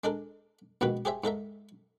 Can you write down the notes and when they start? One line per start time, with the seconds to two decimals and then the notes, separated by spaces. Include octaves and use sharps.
0.04 G#3 D4 A4 A#4
0.81 A#1 G#2 B2 D#3 B4
1.05 G4 G#4 C5 E5
1.24 G#2 A4 A#4 E5